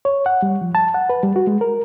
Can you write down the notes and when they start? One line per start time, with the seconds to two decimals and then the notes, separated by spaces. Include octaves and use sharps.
0.05 C#5
0.26 F#5
0.42 G3
0.61 F3
0.75 A5
0.94 F#5
1.10 B4
1.23 G3
1.36 F#4
1.47 G#3
1.61 A#4